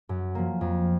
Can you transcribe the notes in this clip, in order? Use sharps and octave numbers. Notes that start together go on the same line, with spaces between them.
F#2
F3 A#3
F2